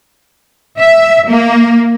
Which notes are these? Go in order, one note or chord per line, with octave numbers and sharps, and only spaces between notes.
E5
A#3